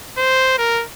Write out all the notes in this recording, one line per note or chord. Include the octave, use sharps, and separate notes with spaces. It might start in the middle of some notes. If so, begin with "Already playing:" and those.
C5
A#4